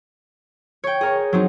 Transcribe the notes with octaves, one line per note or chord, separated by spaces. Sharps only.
C#5 G5
G#4 A#4 C#5
F#3 C4 D#4